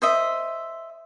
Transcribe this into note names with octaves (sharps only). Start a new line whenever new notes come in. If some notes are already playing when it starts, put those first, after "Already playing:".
C5 D#5 E5